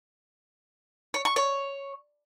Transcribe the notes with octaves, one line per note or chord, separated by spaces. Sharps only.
C#5
C#6
C#5